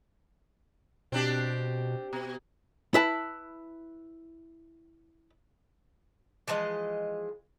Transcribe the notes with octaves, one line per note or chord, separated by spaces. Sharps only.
B2 C4 D4 G4
B2
E4 B4 A5
E3 F3 G#3 D#5